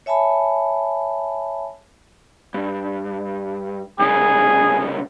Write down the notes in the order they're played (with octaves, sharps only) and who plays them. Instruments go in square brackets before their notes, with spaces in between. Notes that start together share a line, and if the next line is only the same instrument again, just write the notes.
[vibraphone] C#5 E5 G#5 A5 B5
[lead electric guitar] G2
[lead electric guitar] C2 C#3 [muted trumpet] G#4